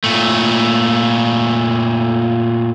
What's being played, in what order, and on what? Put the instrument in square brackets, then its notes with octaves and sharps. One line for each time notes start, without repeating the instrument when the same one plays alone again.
[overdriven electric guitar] A#2 A3